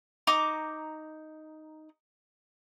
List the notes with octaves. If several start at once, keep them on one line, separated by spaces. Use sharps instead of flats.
D#4 A#5 D6